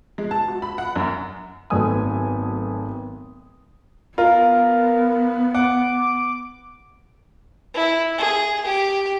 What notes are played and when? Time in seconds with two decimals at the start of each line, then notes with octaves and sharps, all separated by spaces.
0.18 G#3
0.31 A5
0.48 F#4
0.62 B5
0.78 F#5
0.96 F#2
1.70 G#1 F#3 A3 B3 G#5 D#6
4.18 B3 F4 A#4
5.55 F#5 D6
7.74 E4
8.18 G#4
8.65 G4